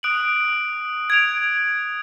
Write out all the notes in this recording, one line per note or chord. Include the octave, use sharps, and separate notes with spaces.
D#6 F#6 D7 F#7
G#6 D7 F7